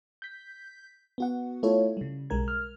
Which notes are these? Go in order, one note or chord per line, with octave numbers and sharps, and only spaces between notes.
G6 B6
B3 F#4 F#5
A3 E4 F4 A4 C#5
C#3 G3
B1 G3 G#3 A#4 G#6
F6